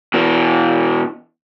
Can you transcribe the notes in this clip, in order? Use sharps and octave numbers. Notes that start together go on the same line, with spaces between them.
B2 E3